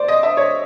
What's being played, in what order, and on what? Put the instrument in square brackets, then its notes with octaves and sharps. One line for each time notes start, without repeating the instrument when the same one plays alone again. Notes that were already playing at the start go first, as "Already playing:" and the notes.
Already playing: [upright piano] C5 D5
D#5
E5
C#5